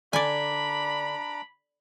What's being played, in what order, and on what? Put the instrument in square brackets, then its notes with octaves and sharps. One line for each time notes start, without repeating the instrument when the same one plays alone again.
[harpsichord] D3 [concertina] D4 A#5 D6 [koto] D5 G#5 [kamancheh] B5